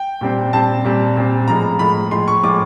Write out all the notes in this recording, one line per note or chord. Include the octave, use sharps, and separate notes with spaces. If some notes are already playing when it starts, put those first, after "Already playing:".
Already playing: G5
A#2 G3 C4
A#2 G3 C4 A5
A#2 G3 C4
A#2 G3 C4
A2 F3 G#3 A#5
A2 F3 G#3 B5
A2 F3 G#3 C6
C#6
A2 F3 G#3 D6